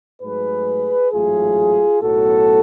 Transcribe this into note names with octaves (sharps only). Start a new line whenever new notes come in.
G#2 F#3 A3 G#4 B4
A1 G#2 F#3 A3 F4 G#4
B1 A2 F#3 B3 F#4 A4